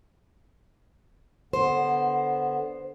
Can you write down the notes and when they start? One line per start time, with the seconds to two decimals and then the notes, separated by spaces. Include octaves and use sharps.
1.53 D3 B3 C5